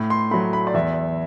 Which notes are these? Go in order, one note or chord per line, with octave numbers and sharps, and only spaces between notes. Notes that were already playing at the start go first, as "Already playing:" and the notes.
Already playing: A2
C6
F#3 A3 B5
B5
D5
E2 E5